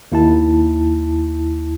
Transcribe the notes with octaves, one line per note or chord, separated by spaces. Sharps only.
D#2 E4 A5